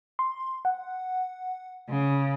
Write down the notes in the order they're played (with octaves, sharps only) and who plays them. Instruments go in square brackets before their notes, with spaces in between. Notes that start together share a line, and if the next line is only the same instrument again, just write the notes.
[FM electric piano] C6
F#5
[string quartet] C#3